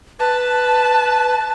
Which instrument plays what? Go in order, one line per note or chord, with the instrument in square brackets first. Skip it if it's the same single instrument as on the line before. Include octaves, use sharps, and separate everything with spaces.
[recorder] B4 [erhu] A5